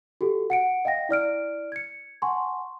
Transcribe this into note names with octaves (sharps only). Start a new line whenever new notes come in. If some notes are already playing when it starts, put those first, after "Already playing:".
F#4 G4 A4
F#5 C#7 D7
D#5 F5 G5 A#6
E4 D5 F6 D7
G#6 C#7
F#5 G#5 A5 C6 C#6